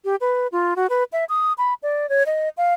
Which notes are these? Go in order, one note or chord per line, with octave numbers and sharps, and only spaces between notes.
G4
B4
F4
F#4
B4
E5
D#6
B5
D5
C#5
D#5
F5